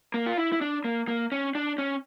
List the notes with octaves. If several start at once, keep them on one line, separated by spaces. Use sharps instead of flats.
A#3
F4
E4
E4
D4
A#3
A#3
C#4
D4
C#4